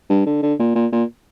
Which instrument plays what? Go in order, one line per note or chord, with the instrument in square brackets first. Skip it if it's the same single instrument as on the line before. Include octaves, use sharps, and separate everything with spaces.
[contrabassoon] G2
D3
D3
A#2
A#2
A#2